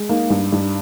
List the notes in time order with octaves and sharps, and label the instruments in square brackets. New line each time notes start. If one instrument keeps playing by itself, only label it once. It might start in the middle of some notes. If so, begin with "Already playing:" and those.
Already playing: [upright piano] G#3
A#3 D#4
G2
G2